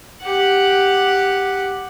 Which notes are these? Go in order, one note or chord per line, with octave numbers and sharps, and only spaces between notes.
G4 F#5